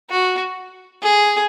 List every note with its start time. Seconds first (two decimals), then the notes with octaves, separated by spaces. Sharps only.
0.10 F#4
1.02 G#4